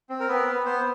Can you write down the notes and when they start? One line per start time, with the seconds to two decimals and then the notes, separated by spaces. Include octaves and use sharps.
0.10 C4
0.20 A#4
0.28 B3 B4
0.47 B3
0.65 B3 C5